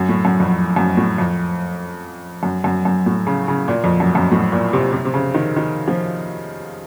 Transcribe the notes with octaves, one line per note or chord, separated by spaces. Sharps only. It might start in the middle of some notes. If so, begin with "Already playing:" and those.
Already playing: F#2
A2
F#2
F2
F#2
A2
F2
F#2
F#2
F#2
A2
C#3
C#3
A#2
F2
F#2
F#2
A2
A#2
C3
C3
C3
C#3
D#3
D#3
F3